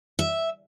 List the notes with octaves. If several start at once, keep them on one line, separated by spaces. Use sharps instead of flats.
E5